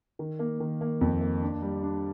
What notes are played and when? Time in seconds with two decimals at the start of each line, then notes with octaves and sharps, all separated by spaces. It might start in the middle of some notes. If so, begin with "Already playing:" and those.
0.19 D#3
0.39 A#3
0.60 D#3
0.81 A#3
1.01 F2
1.21 A#3
1.42 D4
1.62 G3
1.83 D4